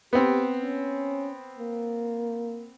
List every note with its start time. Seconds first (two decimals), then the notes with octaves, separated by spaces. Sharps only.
0.13 B3 C4 G4
0.62 C#4
1.59 A#3